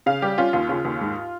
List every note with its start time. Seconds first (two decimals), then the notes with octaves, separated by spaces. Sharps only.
0.06 C#3 F5
0.22 G3 G4
0.38 C#4 F4
0.53 D#2 F4
0.69 C#3 F4
0.85 D#2
1.01 G#2